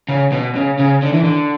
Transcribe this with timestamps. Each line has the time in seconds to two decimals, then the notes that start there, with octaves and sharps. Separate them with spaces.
0.09 C#3
0.32 B2
0.56 C#3
0.80 C#3
1.03 D3
1.14 E3
1.24 D3